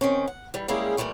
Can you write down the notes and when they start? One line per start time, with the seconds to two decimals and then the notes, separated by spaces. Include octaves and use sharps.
0.01 D#3 C4 C#4
0.27 F#5
0.54 E3 G3
0.68 G3 G#3 A#3 C#4 E4 G#4
0.97 A#2 D#3 E3 G3 A3